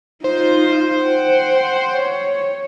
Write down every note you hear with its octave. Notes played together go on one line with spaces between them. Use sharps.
D#4 F4 C5
F#5 G5
C#5